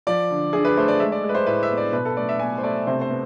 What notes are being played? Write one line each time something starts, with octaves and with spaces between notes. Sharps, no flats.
F3 D5
D3
D3 G#4
B4
A3 C5
D5
G#3 E5
D5
G#3
B4
C5
A2 B4
E5
B3
D5
B2 B4
A4
A3 D5
E5
B2 G#5
C5
A3 D5
C3 C5
C5
B3